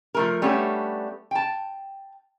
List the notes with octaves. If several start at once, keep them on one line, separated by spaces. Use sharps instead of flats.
F3 A3 A#4
G3 A3 B3 C#4 D4
G5 A5